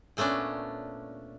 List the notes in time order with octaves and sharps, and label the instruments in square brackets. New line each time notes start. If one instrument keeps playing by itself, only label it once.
[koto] A#2 A3 B3 C#4 D4